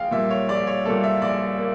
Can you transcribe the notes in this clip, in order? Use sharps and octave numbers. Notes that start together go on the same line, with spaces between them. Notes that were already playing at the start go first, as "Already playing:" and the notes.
Already playing: A#1 F5 G5
A#2 G3 A#3 E5
C#5
A#1 D5
C#5
A#2 G3 A#3 A4
E5
A#1 D5
A#3